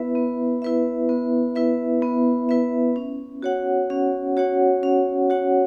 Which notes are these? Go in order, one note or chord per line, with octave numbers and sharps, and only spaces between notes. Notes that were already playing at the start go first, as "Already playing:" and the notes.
Already playing: B3 E4 B4 E5
B3
E4 B4 E5
B3
E4 B4 E5
B3
E4 B4 E5
C#4
F#4 C#5 F#5
C#4
F#4 C#5 F#5
C#4
F#4 C#5 F#5